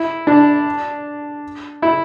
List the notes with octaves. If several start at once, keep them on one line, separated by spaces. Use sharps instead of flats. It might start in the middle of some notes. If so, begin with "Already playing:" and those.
Already playing: E4
D4
E4